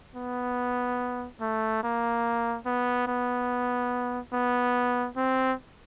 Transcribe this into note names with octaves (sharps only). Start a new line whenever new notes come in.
B3
A3
A#3
B3
B3
B3
C4